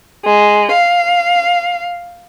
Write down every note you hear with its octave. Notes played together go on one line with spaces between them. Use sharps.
G#3
F5